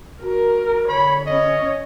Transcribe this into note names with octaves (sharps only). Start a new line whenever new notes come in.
F#4 A#4
D3 C#5 B5
C#4 C#5 D#5